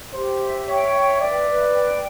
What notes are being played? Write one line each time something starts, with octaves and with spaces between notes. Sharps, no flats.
G4 C5
E5
C#5 G5
E5
B4 D5
B4
G5